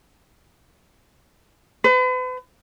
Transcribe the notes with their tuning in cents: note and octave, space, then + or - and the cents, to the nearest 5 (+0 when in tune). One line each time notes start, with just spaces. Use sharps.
B4 +40